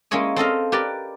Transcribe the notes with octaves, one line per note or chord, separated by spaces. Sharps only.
G#3 A#3 C#4 E4 C#5 D#5
C4 A4 D#5 F5
G4 A#4 B4 D5